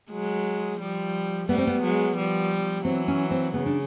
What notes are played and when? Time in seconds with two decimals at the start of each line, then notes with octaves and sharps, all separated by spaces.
0.11 F#3 G#3
0.80 F3 G3
1.49 G3 A3 B3
1.58 C4
1.67 B3
1.82 F#3 G#3
2.16 F3 G3
2.85 E3 F#3 C4
3.08 C#4
3.31 C4
3.54 C#3 B3
3.66 D4